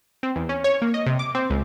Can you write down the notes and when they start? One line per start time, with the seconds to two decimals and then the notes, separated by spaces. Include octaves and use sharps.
0.23 C4
0.36 E2
0.49 C#4
0.64 C#5
0.82 A#3
0.94 D#5
1.06 C3
1.19 D6
1.35 C4
1.50 C#2